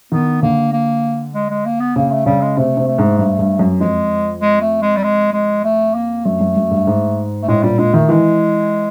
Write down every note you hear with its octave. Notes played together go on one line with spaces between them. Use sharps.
D#3 B3
D3 A#3
A#3
G#3
G#3
A#3
B3
C#3 A#3
A3
C#3 G3
G#3
C3 A3
C3
A3
G#2
G2 A3
G2
F#2
F2 G#3
G#3
A3
G#3
G3
G#3
G#3
A3
A#3
F#2 A3
F#2
F#2
G2
G#2
A3
A2 G#3
A#2 G3
A#2 G#3
D#3 A3
E3 G#3